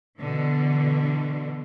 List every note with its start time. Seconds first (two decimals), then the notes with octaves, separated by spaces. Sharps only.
0.19 B2 D3 E3